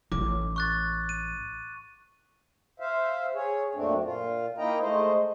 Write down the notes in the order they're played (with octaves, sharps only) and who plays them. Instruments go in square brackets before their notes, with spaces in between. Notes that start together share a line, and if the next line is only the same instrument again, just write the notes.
[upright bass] A1 [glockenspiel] D6
[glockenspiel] C#6 F#6 A6
D#7
[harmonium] C5 E5 F5
G#4 C#5
F#2 A#2 A3 C4 D4
A#2 F4
A#3 D#4 E4 D#5 G5 A#5
G#3 A3 C5 D#5